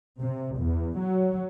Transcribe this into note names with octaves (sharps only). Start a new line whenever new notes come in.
C3
E2
F#3